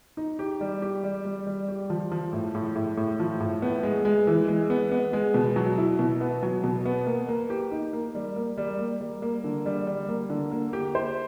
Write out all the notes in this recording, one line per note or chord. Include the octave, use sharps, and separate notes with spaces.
D#4
G4
G3
G4
G3
G3
G3
G4
F3
F3
A2
A2
A2
A2
F3
A2
B3
G#3
G#3
E3
G#3
B3
B3
G#3
B2
F#3
E4
B2
B3
F#3
B2
B3
A#3
A#3
G4
D#4
A#3
G3
A#3
G3
A#3
G3
A#3
D3
G3
G3
A#3
D3
A#3
G4
C5